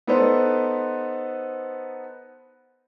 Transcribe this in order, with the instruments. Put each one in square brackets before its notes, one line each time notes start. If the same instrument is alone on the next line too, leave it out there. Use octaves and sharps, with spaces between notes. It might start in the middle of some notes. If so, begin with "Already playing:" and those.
[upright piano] B3 D#4 A4 B4 C5